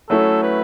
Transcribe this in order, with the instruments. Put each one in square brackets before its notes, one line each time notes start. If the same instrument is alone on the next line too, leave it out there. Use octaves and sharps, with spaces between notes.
[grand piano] F#3 A3 C#4 E4 [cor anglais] A4
[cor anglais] B4